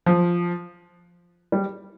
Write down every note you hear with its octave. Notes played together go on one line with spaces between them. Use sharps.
F3
G3